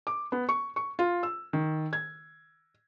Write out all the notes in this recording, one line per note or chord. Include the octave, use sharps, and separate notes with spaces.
D6
B3
C#6
C#6
F4
E6
D#3
G#6